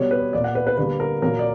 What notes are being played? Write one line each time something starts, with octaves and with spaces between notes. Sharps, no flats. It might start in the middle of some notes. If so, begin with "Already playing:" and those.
Already playing: B2 G3 B3 C#5
B4
A#2 A#3 D5
F#5
B4
B4
D3 G3 A#3 B4
A#4
A#2 F#3 A#3 A#4
D5